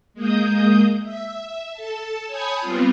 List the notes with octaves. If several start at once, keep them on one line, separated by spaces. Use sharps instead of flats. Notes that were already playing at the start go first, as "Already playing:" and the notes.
G#3 A#3 D#6 G6
E5
A4 A5
C#5 G#5 A5 B5 D#6 G6
G3 B3 C4 F4